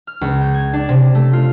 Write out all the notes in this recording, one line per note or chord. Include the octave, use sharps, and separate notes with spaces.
F6
C#2
G6
G#6
D4
C3
A3
F4